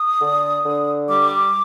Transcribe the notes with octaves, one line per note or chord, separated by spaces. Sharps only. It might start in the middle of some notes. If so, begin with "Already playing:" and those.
Already playing: D#6
D3
D3
G3 D6